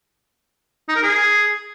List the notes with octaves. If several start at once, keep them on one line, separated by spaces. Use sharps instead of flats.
D#4
A#4
G#4